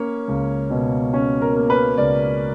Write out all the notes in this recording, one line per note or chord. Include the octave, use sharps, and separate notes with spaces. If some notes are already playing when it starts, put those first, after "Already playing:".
Already playing: A#3 C#4 C#5
C#2
B2
C#4
A#4
A#3
B4
C#2 D5